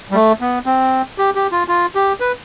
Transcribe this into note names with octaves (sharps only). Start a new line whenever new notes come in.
G3
A3
B3
C4
G4
G4
F4
F4
G4
B4